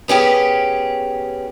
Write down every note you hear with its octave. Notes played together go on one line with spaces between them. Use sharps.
B3 C#4 G4 G#4